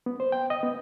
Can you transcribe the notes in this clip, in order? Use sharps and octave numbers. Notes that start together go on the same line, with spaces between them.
B3
C5
G5
D#5
B3